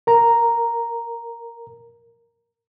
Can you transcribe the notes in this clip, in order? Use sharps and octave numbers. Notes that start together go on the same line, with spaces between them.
A#4 A#5